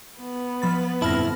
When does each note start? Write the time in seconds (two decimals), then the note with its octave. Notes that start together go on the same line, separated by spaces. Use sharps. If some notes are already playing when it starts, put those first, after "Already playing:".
0.19 B3
0.62 F3 B5 A6
1.02 G1 F2 A2 E4 A5 F6 A#6